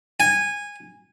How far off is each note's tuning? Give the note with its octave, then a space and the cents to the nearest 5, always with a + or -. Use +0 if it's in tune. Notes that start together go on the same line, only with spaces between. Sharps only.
G#5 -15